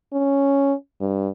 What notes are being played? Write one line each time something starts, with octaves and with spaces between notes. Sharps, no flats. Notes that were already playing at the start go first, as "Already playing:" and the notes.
C#4
G2